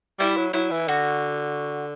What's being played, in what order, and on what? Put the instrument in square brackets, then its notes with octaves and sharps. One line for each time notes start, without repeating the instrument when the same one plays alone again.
[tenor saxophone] G3 [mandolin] E4
[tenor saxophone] F#3
[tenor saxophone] F#3 [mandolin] E4
[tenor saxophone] E3
[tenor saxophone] D3 [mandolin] F#4